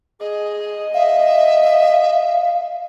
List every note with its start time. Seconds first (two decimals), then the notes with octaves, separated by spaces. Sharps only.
0.20 G#4 D#5
0.94 E5 F5